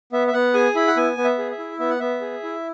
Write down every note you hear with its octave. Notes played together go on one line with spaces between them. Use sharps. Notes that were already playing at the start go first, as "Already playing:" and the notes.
B3 E5
E5
B3 F#5
G#4 G#5
E4 B5
F#5
B3 G#5
B3
E5
G#4
E5
E4
B3 E5
F#5
B3 E5
G#4
E4